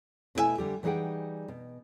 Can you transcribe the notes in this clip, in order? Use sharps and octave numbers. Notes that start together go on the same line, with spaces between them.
B2 A3 E4 F#4 E5 G#5
D3 G3 G4
E3 G3 D#4 G#4 F#5 G5
B2